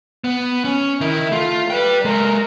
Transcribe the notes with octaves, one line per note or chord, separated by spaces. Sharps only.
B3
C#4
D#3 E4 A#4
A3 F4
B4 D5 G5
G#3 A4 A#4